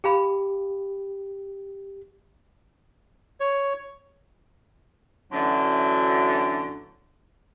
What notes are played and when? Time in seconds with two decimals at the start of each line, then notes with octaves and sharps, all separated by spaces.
0.04 G4 G#4 F5 B5
3.40 C#5
5.32 F#2 D3 E3 F#3 A3 D4